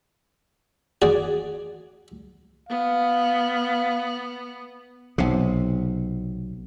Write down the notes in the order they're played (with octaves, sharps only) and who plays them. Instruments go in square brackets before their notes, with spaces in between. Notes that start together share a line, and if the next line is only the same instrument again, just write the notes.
[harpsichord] F#4 G#4 D5
[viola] B3 [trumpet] F5
[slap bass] B1 C3